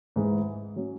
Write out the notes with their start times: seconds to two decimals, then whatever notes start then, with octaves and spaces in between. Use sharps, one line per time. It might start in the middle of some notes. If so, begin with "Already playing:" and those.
0.16 G#2 E3 G#3
0.76 F#3 C#4